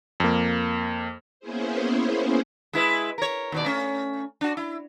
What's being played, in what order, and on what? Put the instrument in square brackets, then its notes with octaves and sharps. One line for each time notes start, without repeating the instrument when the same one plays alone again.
[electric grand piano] F2 A#3
[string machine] A#3 B3 C#4 E4 G#4 C5
[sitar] G#3 E4 B4
A#4 C#5
D#2 B2 D5
A3 C#4
D4 F#4
E4